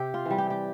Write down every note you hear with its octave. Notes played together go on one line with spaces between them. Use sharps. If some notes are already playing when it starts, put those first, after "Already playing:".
Already playing: C3 C4 G4
F4
E3
G3
G4
G4